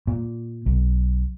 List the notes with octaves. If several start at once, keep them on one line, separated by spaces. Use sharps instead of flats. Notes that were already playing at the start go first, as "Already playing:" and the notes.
A#2
B1